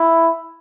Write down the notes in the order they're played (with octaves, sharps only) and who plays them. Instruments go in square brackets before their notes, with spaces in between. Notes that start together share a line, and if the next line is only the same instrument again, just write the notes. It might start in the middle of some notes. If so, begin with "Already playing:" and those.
Already playing: [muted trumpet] E4